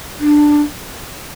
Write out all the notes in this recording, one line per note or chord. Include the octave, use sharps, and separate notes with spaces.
D4